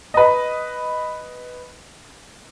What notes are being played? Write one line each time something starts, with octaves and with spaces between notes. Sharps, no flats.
B4 D#5